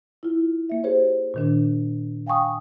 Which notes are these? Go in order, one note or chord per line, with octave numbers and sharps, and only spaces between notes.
E4 F4
A#3 E5
G4 G#4 C5 C#5
A#2 D#3 D4
F5 G5 G#5 C#6 D#6